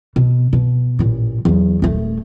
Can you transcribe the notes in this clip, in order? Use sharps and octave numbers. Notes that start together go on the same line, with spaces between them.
B2
B2
A1 A#2
E2 F#3
D#1 A3